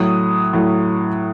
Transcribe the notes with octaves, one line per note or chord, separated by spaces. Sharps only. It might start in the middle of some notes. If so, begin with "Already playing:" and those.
Already playing: A2 F#3 D#6
A2 F#3